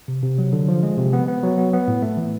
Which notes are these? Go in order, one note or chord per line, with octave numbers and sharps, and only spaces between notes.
C3
C3
F#3
D3
F3
G#3
C3
B3
B3
F#3
B3
B3
A2
A3
E3